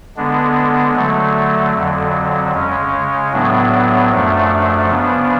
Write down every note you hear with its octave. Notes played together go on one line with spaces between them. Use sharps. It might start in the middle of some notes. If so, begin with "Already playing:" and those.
D3 G#3 B3 D4
D3 F#3 A3
F2 D3 F#3
C#3 G#3 C#4
A2 F#3 B3 D4
F#2 F3 A3 D4
C#3 F3 B3 D4